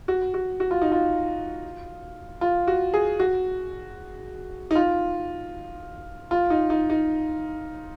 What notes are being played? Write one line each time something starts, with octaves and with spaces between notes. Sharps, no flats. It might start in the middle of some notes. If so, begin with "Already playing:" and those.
F#4
F#4
F#4
F4
D#4
F4
F4
F#4
G#4
F#4
D#4
F4
F4
D#4
D#4
D#4